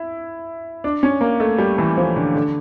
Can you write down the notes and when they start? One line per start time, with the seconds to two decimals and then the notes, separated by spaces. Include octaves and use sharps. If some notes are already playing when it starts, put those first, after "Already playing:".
Already playing: E4
0.84 D4
1.03 C#4
1.21 A#3
1.40 A3
1.58 G3
1.78 E3
1.97 F3
2.16 D3
2.34 D3